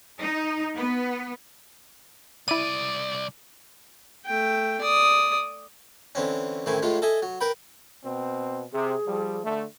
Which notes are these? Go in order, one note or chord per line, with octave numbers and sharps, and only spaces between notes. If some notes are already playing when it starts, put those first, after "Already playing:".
D#4
B3
C2 E4 D5 D#7
A3 G5
D5 D#6
D3 E3 C4 C#4
A1 A2 D#3 C4 E4 G#5
A2 F3 G#3 F4
A4 D#5 E5 G#5
F#3
A#4 B4 G5 B5
B2 C4
C3 G#4
F3 G3
D3 A3